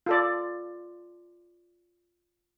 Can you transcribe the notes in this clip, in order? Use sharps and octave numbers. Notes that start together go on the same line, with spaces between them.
F4 A4 D5